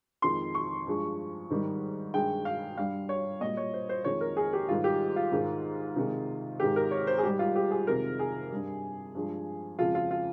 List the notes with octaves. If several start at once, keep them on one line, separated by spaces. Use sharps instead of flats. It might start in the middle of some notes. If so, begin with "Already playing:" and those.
F2 D#3 G#3 C6
C#6
G2 F3 G#3
G#2 D#3 G3
G2 D#3 G#3 G5
F5
G2 G3 F5
C#5
A#2 G3 D#5
C#5
C5
C5
F2 D#3 G#3 C#5
A#4
G#4
G4
G#2 D#3 G3 F4
G4
F4
G#2 D#3 G#3
C3 D#3 G#3
G#2 D#3 G#3 G4
A#4
C#5
C5
G#4
G#2 G3 G4
F4
G4
G#4
F2 C3 D#3 G#3 A#4
G#4
G2 G3
G2 F3 G#3
F2 C#3 F3 G#3 F4
F4
F4